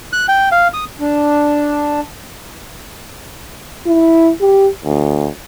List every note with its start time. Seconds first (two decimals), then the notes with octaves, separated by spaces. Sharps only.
0.13 F#6
0.28 G5
0.52 F5
0.73 D#6
0.99 D4
3.87 E4
4.41 G4
4.85 D2